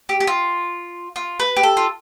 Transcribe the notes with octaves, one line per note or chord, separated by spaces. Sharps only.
G4
G4
F4
F4
B4
G4
A4
F4